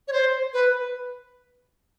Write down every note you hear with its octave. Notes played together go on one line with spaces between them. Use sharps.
C#5
C5
B4